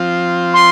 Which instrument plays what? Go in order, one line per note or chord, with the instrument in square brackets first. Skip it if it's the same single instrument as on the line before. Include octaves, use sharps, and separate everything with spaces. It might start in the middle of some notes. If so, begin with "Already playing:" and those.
Already playing: [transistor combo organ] F3 C4 F4
[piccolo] C6